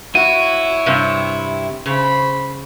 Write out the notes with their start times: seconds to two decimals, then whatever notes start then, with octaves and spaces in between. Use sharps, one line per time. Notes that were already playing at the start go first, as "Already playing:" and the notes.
0.15 E4 F#4 C#5 D#7
0.86 G2 C3
1.86 C#3 C5 B5